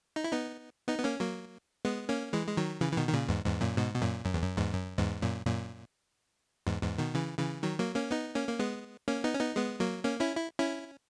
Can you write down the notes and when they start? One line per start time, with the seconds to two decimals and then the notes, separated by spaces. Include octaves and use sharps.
0.16 D#4
0.24 E4
0.32 B3 D#4
0.88 B3 D#4
0.99 B3
1.04 A#3 C#4
1.20 F#3 A#3
1.85 G#3 B3
2.09 A#3 C#4
2.33 E3 G#3
2.47 G#3
2.57 D#3 F#3
2.81 C#3 E3
2.92 E3
2.97 B2 D#3
3.09 D#3
3.13 A#2 C#3
3.29 E2 G#2
3.45 E2 G#2
3.61 F#2 A#2
3.77 G#2 B2
3.94 B2
4.01 F#2 A#2
4.25 F#2
4.34 E2
4.42 F#2
4.57 E2 G#2
4.74 F#2
4.98 E2 G#2
5.22 F#2 A#2
5.46 F#2 A#2
6.67 E2 G#2
6.83 E2 G#2
6.98 B2 D#3
7.14 C#3 E3
7.39 C#3 E3
7.63 D#3 F#3
7.79 F#3 A#3
7.95 A#3 C#4
8.11 B3 D#4
8.35 A#3 C#4
8.49 A#3
8.60 G#3 B3
9.08 A#3 C#4
9.24 B3 D#4
9.34 C#4
9.39 B3 D#4
9.56 G#3 B3
9.80 F#3 A#3
10.04 A#3 C#4
10.20 C#4 E4
10.36 E4
10.59 C#4 E4